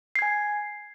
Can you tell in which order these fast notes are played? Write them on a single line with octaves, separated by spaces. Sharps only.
C7 G#6 G#5